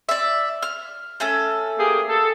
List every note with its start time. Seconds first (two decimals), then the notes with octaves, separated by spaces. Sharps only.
0.09 D5 E5
0.62 F6
1.20 A3 C#4 A4
1.79 A#3 G4 G#4
2.09 A4